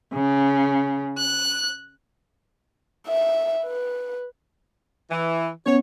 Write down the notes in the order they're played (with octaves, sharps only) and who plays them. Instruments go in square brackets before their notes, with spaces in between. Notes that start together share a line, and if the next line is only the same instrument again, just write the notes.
[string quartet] C#3
F#6
[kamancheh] E5
B4
[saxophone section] E3
[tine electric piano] B3 C#4 [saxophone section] C#5